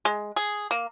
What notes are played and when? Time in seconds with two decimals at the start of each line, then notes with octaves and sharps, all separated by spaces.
0.05 G#3
0.36 G#4
0.71 A#3